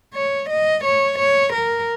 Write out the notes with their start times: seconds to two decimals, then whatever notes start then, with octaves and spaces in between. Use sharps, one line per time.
0.14 C#5
0.50 D#5
0.85 C#5
1.19 C#5
1.54 A#4